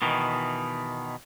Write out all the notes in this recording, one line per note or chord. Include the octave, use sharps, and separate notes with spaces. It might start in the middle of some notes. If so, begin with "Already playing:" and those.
B2 D#3 E3